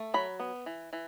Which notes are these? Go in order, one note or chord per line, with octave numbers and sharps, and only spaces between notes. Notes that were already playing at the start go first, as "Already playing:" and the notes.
Already playing: A3
F#3 B5
B3
E3
E3